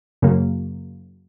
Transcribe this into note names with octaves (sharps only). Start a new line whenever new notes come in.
F#2 C#3 F#3 A#3